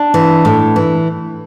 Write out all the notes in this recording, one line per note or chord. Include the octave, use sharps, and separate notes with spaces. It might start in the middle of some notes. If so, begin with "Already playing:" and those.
Already playing: D4
E3
A2
E3